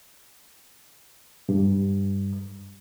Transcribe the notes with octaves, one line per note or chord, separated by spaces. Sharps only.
G2